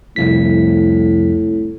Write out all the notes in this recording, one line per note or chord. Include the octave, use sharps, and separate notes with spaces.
C2 F2 A2 B6